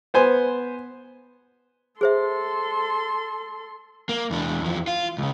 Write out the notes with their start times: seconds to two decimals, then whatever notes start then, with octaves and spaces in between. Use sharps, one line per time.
0.14 B3 C5 G#5
2.01 G#4 A4 C5 E5 C6
4.09 A#3
4.31 E2 D4
4.61 E2 F3
4.88 F4
5.18 C#2 C#3